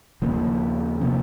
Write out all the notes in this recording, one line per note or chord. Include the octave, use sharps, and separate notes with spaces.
D#2 C#3 F3 A#3
C3 F3 A#3